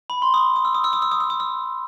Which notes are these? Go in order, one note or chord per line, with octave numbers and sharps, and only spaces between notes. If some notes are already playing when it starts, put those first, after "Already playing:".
B5
C6
D#6
D#6
E6
D#6
E6
D#6
E6
D#6
E6
D#6
E6